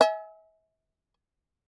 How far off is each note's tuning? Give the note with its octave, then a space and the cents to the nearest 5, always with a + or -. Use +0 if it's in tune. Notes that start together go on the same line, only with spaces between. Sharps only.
E5 -40 G#5 +15